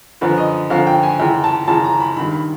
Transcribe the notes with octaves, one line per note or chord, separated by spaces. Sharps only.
F#2 D3 F3 B4
D#5
F#2 D3 F3 F5
G5
G#5
F#2 C#3 E3 G5
A5
F#2 C#3 E3 A5
A#5
B5
G2 D#3 B5
B5